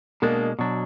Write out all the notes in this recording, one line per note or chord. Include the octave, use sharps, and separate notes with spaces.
B2 G#3 A#3 D4
B2 F#3 D4